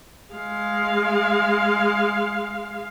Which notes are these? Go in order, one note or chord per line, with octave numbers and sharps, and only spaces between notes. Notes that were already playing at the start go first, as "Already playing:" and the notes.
G#3 F5